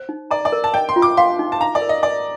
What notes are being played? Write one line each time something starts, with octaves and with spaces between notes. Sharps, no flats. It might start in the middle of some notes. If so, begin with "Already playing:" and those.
Already playing: C5
D#4
D5 A#5
D5
A#4
A5
D#5 G5
C6
F4
D6
F5 C6
D#4
A5
F5 A#5
D5
A#4
D#5
D5 D#5